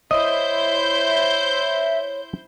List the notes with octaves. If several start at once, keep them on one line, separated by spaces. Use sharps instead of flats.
E4 C5 C#5 D#5 E5 G6